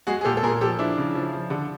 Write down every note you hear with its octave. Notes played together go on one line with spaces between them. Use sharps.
G#3 F#4 G#4
G#4
A#2 G4 A4
A4
A#2 G#4 A#4
F3 G4 A4
F3 D4 E4
C#3
F3
F3
D3